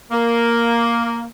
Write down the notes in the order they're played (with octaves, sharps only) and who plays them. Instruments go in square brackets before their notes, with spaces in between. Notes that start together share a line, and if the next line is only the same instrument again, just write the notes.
[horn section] A#3